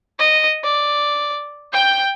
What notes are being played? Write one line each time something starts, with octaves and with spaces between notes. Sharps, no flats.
D#5
D5
G5 G6